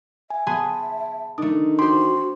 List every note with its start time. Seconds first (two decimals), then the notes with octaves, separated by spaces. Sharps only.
0.30 E5 G#5
0.47 B3 G#4 A5 C6
1.38 D#3 A3 D4 D#6
1.79 F#4 G4 C5 C6